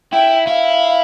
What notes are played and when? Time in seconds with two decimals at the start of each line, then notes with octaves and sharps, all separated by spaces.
0.13 E4 G5
0.47 E4 F5